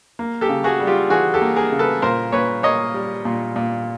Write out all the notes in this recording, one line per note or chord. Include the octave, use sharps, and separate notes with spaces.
A#3
G4 A4
C#3
F#4 G#4
G3
F4 G4
E3 F#4 G#4
G4 A4
A#3
G#4 A#4
C#3
A4 B4
A#2 A#4 C5
A#2 B4 C#5
A#3 C#5 D#5
G3
A#2
A#2